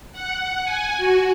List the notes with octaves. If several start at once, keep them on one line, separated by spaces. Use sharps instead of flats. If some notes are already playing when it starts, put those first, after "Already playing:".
F#5
G#5
F#4